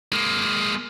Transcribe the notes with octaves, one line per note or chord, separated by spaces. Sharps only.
G#3 A#3